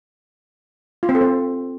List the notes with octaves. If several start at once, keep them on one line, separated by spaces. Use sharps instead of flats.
F4
C4
A4
C4